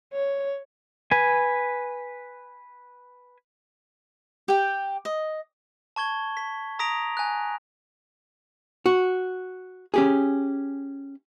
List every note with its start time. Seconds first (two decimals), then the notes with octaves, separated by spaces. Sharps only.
0.13 C#5
1.11 B4 G#5
4.48 G4 G5
5.05 D#5
5.96 A5 C#6 G#6 G7
6.37 B6
6.79 A#5 D#6 A#6 B6 D7 F7
7.17 G#5 F#6
8.86 F#4
9.94 C#4 G4 G#4